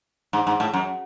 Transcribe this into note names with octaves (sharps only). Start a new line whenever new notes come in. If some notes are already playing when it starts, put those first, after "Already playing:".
G#2
G#2
A2
F#2